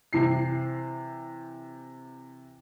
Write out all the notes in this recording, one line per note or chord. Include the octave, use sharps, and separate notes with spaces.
C3 E3 C7